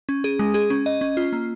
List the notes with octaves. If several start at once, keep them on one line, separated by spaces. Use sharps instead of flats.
C#4
G#4
G#3
G#4
C#4
D#5
C#4
F4
A#3